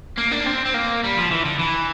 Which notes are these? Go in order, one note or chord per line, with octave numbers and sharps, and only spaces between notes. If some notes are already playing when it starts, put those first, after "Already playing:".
A#3
D4
C4
C4
A#3
G3
F3
E3
D3
E3